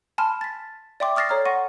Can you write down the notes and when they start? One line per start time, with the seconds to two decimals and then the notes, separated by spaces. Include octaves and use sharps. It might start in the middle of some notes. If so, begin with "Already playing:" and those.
0.18 G#5 A5 B5 C6 F6
0.41 A6 B6
1.00 D5 E5 G5 C6 D6
1.16 C#6 D#6 F6 A6 A#6 C7
1.29 A4 C#5 A#5 F6
1.45 F#5 C6 C#6 A#6 D#7